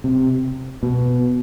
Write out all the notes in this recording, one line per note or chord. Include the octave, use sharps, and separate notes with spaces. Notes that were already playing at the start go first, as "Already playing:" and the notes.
C3
B2